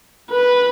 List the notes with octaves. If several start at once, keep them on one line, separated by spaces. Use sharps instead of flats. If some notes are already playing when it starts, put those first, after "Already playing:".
B4